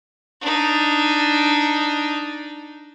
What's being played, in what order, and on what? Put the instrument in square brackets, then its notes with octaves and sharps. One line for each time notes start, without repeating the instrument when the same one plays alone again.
[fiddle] D4 D#4